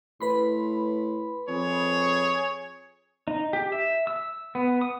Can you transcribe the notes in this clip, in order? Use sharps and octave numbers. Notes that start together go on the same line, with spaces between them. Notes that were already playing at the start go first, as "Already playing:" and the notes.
A2 B4 B5 C6
F2 G#4 C#5
D#4
G4
E5
E6
B3
D#6